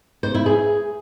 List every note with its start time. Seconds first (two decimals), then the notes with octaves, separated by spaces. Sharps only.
0.23 C5
0.35 E4
0.46 G#4